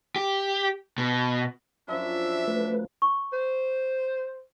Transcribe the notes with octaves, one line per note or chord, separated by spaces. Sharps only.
G4
B2
F#2 F3 D4 E5
A3 B4
C#6
C5